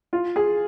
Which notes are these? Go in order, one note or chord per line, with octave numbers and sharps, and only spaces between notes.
F4
G#4